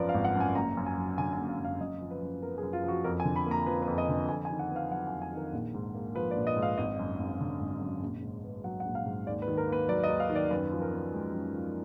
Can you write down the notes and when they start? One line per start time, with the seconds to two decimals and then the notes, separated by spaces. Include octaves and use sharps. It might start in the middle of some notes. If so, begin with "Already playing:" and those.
Already playing: G#1 F#2 F3 B3 A#4 B4 D5
0.09 F5
0.14 G#1
0.24 F#5
0.35 F#2
0.40 G#5
0.55 F#1 A#5
0.77 F#2
0.86 G#5
0.97 F#3
1.18 D3 G#5
1.33 G#5
1.39 F#1
1.49 F5
1.59 F#2
1.65 F5
1.80 F#2 D#5
2.01 F3
2.11 B4
2.22 F#2
2.42 B3 A#4
2.58 G#4
2.63 F#2
2.73 F4
2.84 F3 F#4
3.04 F2 A#4
3.20 G#5
3.25 D3
3.36 B5
3.46 A#3 A#5
3.66 F3 B4
3.82 B4
3.88 F2
3.98 D#5
4.09 D3
4.29 F2 G#5
4.45 G#5
4.50 D#3
4.59 F#5
4.71 B3
4.76 F5
4.91 F#3 F#5
5.07 G#5
5.12 F2
5.22 G#5
5.33 D#3 A#4
5.53 A#1
5.74 G#2
5.94 A#3
6.15 F3 B4
6.31 D5
6.36 A#1
6.47 D#5
6.56 G#2
6.62 F5
6.78 G#1 D#5
6.99 F#2
7.19 G#1
7.40 D3
7.61 G#1
7.81 F#2
8.02 A#1
8.22 G#2
8.44 B3
8.64 F#3 F#5
8.80 F#5
8.85 A#1
8.95 F5
9.06 G#2
9.26 D#2 D5
9.42 B4
9.48 D#3
9.58 A#4
9.68 A#3 B4
9.88 F#3 D5
10.04 D#5
10.09 D#2
10.20 F5
10.30 D#3
10.35 D5
10.50 F#2 B4
10.72 F3
10.82 A#4
10.93 B3
11.13 G#3
11.34 F#2
11.54 F3